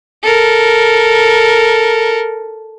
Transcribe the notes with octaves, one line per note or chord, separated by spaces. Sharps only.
A4 A#4